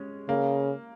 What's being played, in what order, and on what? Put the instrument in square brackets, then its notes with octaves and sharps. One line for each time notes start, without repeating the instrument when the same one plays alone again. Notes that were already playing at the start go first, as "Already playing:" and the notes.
Already playing: [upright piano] G#3 C#4
[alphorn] C#3 [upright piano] A#3